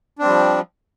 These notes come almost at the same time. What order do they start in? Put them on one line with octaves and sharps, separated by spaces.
D4 C4 G3 F3